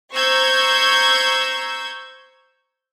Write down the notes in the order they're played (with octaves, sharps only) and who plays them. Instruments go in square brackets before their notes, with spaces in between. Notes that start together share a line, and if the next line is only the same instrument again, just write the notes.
[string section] C5 A#5 C#6 E6 G6 G#6